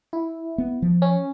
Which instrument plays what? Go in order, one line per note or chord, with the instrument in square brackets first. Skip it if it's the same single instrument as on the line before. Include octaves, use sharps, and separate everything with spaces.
[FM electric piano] E4
[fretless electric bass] B3
F3
[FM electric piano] C#4